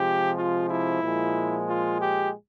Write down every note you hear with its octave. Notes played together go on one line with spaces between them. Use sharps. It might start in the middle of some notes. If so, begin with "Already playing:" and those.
Already playing: C3 F3 G#3 G4
F4
E4
A#2 F3 G#3
F4
G4